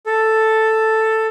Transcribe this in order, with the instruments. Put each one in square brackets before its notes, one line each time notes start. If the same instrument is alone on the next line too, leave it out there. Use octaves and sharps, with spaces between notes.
[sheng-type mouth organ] A4